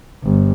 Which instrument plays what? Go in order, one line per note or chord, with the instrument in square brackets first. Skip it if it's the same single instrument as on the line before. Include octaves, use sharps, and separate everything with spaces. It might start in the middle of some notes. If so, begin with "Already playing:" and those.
[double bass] G1